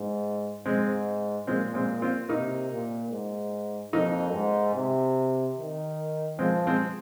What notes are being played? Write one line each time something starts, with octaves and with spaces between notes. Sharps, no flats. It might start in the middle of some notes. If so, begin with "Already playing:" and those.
Already playing: G#2
G#2 G#3 C4
A#2 G#3 C4
G#3 C4
C4 F4
C3 A#3 D#4
A#2
G#2
F2 A#3 D#4
G#2
C3
D#3
F3 G#3 C4
G#3 C4